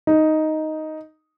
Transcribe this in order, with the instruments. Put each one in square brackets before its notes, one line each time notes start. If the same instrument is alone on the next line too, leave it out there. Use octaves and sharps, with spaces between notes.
[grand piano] D#4